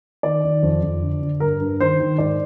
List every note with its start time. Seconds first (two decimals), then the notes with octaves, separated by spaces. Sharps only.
0.23 D#3 D5
0.44 D#3
0.63 F2
0.83 F2
1.02 D3
1.22 D3
1.40 G2 A#4
1.60 G2
1.80 D#3 C5
2.00 D#3
2.18 G#2 D5